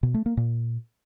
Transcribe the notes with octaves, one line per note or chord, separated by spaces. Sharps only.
B2
A3
A#3
A#2